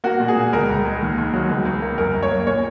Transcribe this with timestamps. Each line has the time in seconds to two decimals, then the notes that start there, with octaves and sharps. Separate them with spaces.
0.04 A#3 F#4
0.20 A#2
0.28 G#4
0.36 A#2
0.53 C#2 A#4
0.69 C#2
0.85 G#3
1.01 D#2
1.18 D#2
1.34 F#3
1.49 C#2
1.65 C#2
1.82 A#3
1.98 F#2 A#4
2.14 F#2
2.23 C#5
2.31 A#3
2.47 A#2 C#5